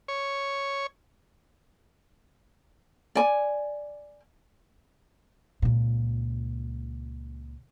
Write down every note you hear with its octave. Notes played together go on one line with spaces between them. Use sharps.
C#5
D5 G#5
C#2 A#2